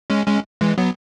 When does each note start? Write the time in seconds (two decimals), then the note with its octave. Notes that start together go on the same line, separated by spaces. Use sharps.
0.10 G#3 C#4
0.27 G#3 C#4
0.61 E3 G#3
0.78 F#3 B3